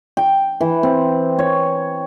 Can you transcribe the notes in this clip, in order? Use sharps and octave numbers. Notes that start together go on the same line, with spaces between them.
G5
E3
C4
C#5